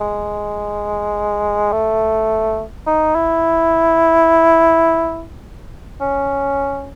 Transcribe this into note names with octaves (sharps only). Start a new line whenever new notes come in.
G#3
A3
D#4
E4
C#4